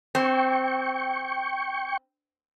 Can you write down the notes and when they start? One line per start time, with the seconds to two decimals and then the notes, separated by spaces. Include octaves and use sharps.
0.15 C4 G5 C#6